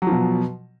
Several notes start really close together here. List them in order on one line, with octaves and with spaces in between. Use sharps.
F#3 F3 B2